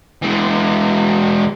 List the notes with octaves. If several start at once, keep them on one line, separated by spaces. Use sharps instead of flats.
E3 G#3